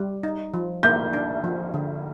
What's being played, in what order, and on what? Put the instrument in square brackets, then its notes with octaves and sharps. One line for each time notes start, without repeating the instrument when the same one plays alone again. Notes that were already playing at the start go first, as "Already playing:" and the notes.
Already playing: [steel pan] G3
D#4
F3
[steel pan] A#3 [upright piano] G6
[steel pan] D4
F3
D3